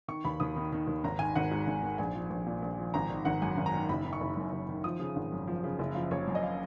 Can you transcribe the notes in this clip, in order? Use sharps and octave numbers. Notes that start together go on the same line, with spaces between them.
D#3 C#6
D#2 B5
D#2 D#6
D#3
D#3
D#2
G#1 A#5
D#3 G#5
G#1 F#5
G#2
G#1
D#3
A#1 G#5
F3
A#1
A#2
A#1
F3
G#1 A#5
D#3
G#1 F#5
F#2 G#5
G#1
A#5
D#3
F#1 B5
D#3
C#6
F#1
F#2
F#1
D#3
F3 D#6
C#3
G#1
F#2
F3
C#3
F#1
F3 F5
F#1 C#5
F#2
D#5
F5